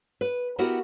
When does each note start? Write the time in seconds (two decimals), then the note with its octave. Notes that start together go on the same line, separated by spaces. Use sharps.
0.21 B4
0.58 B3 E4 F#4 G4 A#4